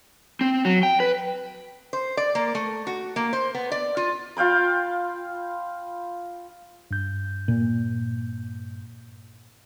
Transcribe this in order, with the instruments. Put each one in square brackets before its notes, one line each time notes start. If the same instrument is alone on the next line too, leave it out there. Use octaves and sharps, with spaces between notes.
[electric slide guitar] C4
F#3
G5
B4
[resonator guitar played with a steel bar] C5
D5
A#3
A3
F#4
A#3
C5
B3
D5
F4
[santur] F4 F5 G5 B5
[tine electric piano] G2 G6
[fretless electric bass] A#2